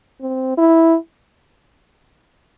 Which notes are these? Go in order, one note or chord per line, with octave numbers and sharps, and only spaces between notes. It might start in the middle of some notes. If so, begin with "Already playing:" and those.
C4
E4